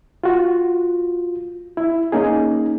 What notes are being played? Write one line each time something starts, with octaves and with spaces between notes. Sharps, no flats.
F4 F#4
E4
A#3 C#4 D#4 G#4